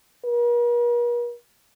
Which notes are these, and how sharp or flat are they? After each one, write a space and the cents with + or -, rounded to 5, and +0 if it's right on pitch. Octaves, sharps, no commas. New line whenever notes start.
A#4 +45